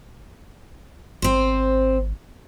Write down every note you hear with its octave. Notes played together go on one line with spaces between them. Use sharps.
G#1 C4 C5